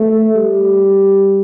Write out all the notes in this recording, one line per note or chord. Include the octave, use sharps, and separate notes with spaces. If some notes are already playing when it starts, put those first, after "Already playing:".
Already playing: A3
G3